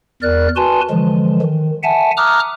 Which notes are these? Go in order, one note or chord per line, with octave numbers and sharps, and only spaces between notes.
E2 A#4 D5 F#6
F#4 B4 G#5 A5 C6
D3 E3 F3 G#3
D#3
E5 F#5 G#5 A5
A#5 D6 D#6 F6 F#6